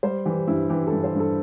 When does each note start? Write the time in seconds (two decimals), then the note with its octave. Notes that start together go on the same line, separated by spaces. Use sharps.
0.03 G3 C5
0.25 E3 G4
0.48 G2 E4
0.69 E3 G4
0.87 A4
0.92 G2
1.04 C5
1.15 G2 A4